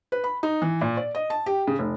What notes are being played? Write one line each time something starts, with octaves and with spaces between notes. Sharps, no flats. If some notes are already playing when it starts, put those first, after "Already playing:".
B4
B5
D#4
E3
A#2
D5
D#5
A5
G4
C#3
F1